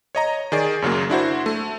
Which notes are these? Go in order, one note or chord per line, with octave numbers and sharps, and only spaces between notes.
C#5 D#5 A#5
D#3 G#4 D5
F#2 C#3 F#3 A#3
D4 E4 F#4 C5
A3